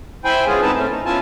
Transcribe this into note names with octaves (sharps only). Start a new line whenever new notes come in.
E4 C5 G5 G#5 B5
G#3 B3 C#4 F4 G#4
G#2 C4 D#4 E4 B4 A5
A3 C4 C#4
D#4
B3 C#4 E4 F4 G#5 A5